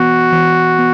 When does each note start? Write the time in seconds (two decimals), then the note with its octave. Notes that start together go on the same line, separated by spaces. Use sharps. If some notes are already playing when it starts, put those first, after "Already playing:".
Already playing: E3 B3 F#4
0.32 E3
0.79 B3